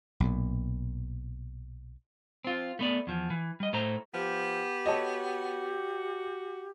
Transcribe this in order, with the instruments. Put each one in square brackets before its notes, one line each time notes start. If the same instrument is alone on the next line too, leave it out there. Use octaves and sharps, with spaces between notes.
[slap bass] B1 A#2
[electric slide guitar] C4 F4
A3 B3 D5
E2 F3
E3
G3 D#5
A2 A3 C5 A#5
[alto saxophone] F3 [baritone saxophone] B3 [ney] G4
[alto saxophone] F#4 [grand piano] A4 C#5 D#5